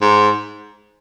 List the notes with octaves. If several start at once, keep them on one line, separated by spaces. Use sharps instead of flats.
G#2